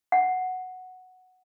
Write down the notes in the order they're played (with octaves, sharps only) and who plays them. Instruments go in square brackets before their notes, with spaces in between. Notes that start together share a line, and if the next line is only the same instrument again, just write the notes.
[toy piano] F#5